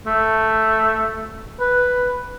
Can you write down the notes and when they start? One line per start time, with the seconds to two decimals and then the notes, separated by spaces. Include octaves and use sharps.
0.06 A3
1.60 B4